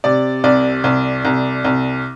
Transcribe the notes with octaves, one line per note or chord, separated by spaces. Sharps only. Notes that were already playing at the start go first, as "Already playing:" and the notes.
C3 D5
C2 D5
C2
C2
C2